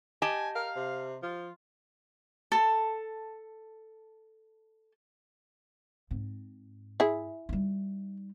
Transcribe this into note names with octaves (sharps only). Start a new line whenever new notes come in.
G4 D#5 G#5 A5
A#4 F5
C3
F3 F4
A4 A5
G#2 C4
E4 G#4
G3 D#4